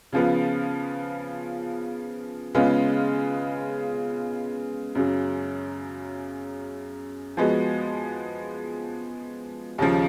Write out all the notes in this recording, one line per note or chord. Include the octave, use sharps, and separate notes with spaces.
C#3 F3 B3 F4
C#3 G#3 B3 F4
F#2 C#3 F#3
F3 G#3 B3 F#4
D#2 C#3 F3